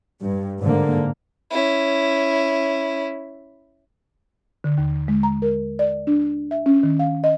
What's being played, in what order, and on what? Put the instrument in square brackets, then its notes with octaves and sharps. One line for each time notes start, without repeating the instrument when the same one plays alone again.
[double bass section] G2
G#2 D3 A#3
[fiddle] C#4 E4
[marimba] D3
D#2
G#3
A#5
A#4
D5
D4
E5
C#4
D#3
F5
D#5